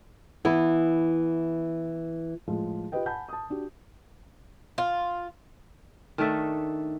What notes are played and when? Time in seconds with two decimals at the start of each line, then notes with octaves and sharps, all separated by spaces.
0.45 E3 B3 E4
2.48 A2 F3 G#3
2.92 F4 G4 B4 D#5 G5
3.06 F#5 G#5 A5 B5 G6
3.29 A5 D#6
3.50 D4 F#4 G4
4.78 F4
6.18 D#3 A3 D4 E5